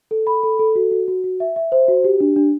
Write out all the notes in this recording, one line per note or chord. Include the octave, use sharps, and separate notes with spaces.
A4
B5
A4
A4
F#4
F#4
F#4
F#4
E5
E5
C5
F#4
G4
D4
D4